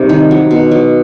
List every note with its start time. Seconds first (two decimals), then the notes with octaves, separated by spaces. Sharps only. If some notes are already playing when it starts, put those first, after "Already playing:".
Already playing: C3 G3 D#4
0.09 D#3
0.31 F#3
0.51 B2
0.71 F#3